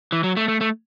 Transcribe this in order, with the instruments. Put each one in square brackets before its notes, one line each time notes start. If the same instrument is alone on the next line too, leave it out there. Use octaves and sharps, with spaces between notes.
[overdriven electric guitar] E3
F#3
A3
A3
A3